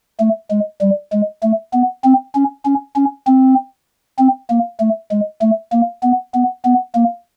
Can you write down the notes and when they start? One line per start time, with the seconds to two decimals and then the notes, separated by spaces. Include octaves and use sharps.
0.20 A3
0.51 G#3
0.81 G3
1.12 G#3
1.43 A3
1.73 B3
2.04 C4
2.35 C#4
2.65 C#4
2.96 C#4
3.27 C4
4.19 C4
4.50 A#3
4.80 A3
5.11 G#3
5.42 A3
5.73 A#3
6.03 B3
6.34 B3
6.65 B3
6.95 A#3